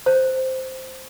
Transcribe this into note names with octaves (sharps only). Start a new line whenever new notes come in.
C5